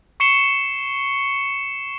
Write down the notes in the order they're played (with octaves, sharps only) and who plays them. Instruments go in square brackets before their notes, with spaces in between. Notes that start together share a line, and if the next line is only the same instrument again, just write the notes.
[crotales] C#6 C7 C#7 E7 G7